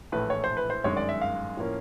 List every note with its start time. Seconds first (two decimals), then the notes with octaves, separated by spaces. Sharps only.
0.12 A#1 A2 E3 A3 B4
0.30 C#5
0.44 C5
0.57 B4
0.70 C5
0.84 G1 F#2 D#3 G#3 C#5
0.97 D5
1.09 E5
1.22 F5
1.57 A2 F3 A#3 C#4